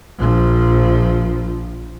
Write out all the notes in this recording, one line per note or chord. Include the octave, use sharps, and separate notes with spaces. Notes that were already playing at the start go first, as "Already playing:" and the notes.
A#1 F3